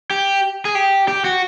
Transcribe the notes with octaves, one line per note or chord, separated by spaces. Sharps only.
G4
G#4
G4
G4
F#4